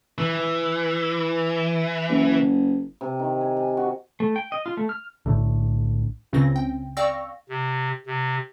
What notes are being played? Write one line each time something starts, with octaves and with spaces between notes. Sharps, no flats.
E3
F#1
C3
D#3
G#5
G#5
F#4
A3
G5
D#5
F4
A3
F6
B1 A2 D3
C#2 C#3 C4 A#6
G5
D5 F5 G5 C#6 E6 A#6
C3
C3